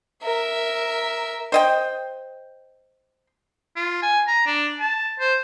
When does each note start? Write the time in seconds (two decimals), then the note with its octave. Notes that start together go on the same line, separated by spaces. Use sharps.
0.22 A#4 E5
1.52 C5 D#5 G5
3.76 F4
4.02 G#5
4.28 A#5
4.47 D4
4.80 A5
5.20 C5